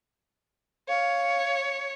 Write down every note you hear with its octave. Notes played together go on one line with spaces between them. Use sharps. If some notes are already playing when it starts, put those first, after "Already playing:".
C#5 F5